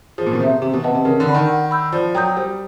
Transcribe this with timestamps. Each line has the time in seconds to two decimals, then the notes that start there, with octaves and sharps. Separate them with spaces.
0.18 F3 G#4
0.26 A#2
0.33 B2
0.40 C3 C5 E5
0.62 C3 G4
0.73 B2
0.83 C3 B4 D#5 F#5 A5
0.95 C3
1.05 C#3 A#4
1.20 D3
1.27 D5 F#5 B5
1.34 D#3
1.49 F#5
1.71 B5 E6 G6
1.92 F3 D5
2.15 F#3 G5 A#5 D#6 G6
2.36 G3 C5